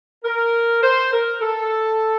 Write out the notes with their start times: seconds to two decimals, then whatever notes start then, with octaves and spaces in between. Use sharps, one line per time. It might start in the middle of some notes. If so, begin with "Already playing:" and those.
0.24 A#4
0.83 C5
1.13 A#4
1.41 A4